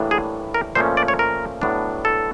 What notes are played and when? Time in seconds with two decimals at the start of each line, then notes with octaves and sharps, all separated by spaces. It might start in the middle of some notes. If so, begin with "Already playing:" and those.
Already playing: A2 E3 G3 A#3 D4
0.11 G#4
0.54 A#4
0.75 A#2 F3 A3 C#4 C5
0.97 D5
1.08 C#5
1.19 A#4
1.62 A2 F#3 B3 D4
2.05 A4